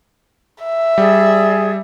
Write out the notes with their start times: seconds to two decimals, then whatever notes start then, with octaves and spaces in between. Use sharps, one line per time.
0.64 E5
0.98 G3 G#4 D5